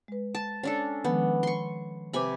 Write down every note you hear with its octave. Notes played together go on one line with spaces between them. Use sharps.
G#3 B4
A5
C#4 D4 A4
D#3 F3 G#3 B3
C6 C#6
C3 B4 G#5 B5 D6